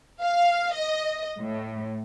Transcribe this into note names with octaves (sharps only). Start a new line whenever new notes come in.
F5
D#5
A2